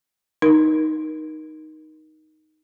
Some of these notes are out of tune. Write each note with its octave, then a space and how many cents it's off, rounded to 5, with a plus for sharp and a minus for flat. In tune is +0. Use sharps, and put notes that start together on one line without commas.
D#4 +0 A#4 +20